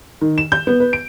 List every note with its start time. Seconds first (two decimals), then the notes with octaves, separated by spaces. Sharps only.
0.21 D#3
0.38 E7
0.52 G6
0.67 B3
0.80 B4
0.93 D7